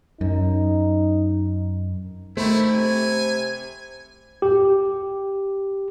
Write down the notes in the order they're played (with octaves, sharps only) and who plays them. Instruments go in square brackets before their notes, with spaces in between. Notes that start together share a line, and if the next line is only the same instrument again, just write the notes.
[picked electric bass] F#2 [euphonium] D#4
[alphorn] D#3 [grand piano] A3 [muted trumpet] E4 [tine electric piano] C5 B5
[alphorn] C3 [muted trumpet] G#5
[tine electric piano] G4